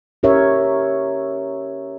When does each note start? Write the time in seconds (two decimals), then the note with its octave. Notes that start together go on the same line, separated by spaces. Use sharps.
0.23 C#4 G4 A#4 C#5 E5